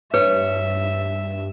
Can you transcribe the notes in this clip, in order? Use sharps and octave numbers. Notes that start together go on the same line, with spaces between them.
G2 B4 C#5 E5